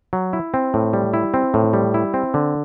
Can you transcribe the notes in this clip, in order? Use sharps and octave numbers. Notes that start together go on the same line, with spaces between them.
F#3
E4
C4
A2
G3
E4
C4
A2
G3
E4
C4
D3